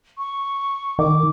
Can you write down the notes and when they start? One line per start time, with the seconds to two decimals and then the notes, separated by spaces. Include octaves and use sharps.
0.18 C#6
0.99 D#3 D6